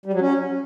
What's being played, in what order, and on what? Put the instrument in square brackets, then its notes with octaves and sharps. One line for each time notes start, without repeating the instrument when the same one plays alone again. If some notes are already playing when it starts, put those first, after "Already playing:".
[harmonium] G3
F#3
C#4